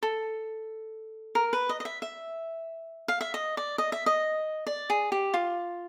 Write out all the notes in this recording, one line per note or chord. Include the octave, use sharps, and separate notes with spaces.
A4
A#4
B4
D#5
D#5
E5
E5
F5
E5
D#5
D5
D#5
E5
D#5
D5
G#4
G4
F4